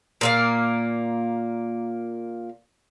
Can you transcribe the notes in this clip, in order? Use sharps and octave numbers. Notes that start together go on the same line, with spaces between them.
A#2 A#3 F5